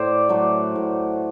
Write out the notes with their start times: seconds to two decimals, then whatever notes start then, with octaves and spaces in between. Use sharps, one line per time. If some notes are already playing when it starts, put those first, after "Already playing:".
Already playing: A2 C5 D5
0.29 F#3 A3
0.75 A2